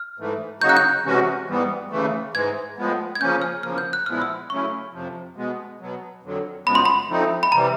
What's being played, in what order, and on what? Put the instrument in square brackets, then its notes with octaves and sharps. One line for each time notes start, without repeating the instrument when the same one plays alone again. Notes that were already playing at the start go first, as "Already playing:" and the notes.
Already playing: [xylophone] F6
[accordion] G#2 E3 A3
[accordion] C#3 F#3 A#3 D#4 F#4 [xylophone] G6
[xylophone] F#6
G6
[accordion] C3 E3 G#3 C#4 F#4
G#2 E3 G3 B3
D#2 C#3 E3 A3
[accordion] G#2 E3 G#3 [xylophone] G#6
[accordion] A2 F3 G#3 B3
[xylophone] G#6
[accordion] C#3 F3 A#3 C#4 [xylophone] G6
[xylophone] F6
[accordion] E2 C#3 F3 A#3 [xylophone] F6
[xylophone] G6
F#6
[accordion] A#2 F3 G#3 B3 E4 [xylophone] F6
[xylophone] E6
[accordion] C#3 F#3 A3 C#4 E4 [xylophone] C#6
[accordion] F2 C3 F3
B2 G#3 B3
B2 F#3 B3
F2 D3 F#3
[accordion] F#2 C#3 F3 G#3 B3 [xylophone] B5
[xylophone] C6
B5
[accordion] D3 F3 A3 C4 D#4
[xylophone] B5
[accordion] C3 E3 G3 [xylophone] A#5